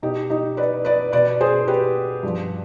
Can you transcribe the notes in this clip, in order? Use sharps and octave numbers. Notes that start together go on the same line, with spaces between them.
B2 D#4 G4
D#4 G4
B4 D5
B4 D5
B2 B4 D5
G#4 C5
G4 B4
G2 F3